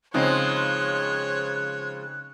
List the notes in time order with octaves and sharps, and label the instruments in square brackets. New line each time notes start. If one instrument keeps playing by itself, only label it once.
[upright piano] C#3 C4 D#4 [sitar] F3 G#3 [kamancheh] C#5 [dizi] F#6